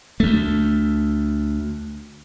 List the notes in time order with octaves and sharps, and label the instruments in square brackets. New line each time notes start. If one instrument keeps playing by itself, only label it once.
[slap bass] D2 A3